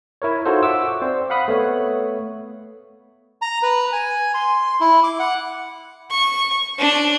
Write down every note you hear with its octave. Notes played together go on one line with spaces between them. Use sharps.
E4 A#4 C#5
D#4 F4 F#4 A4 C5 C#5
E5 F#5 C#6 D6 E6
C4 C5 D5
F5 F#5 B5 D#6 F#6
A3 B3 C#5
A#5
B4
G#5
C6
E4
D6
F#5
C#6
D4